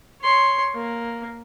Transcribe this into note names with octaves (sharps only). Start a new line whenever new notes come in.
C#5 C6
A#3